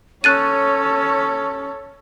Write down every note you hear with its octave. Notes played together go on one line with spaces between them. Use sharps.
C#4 A4 C#5 F#6 A6 D#7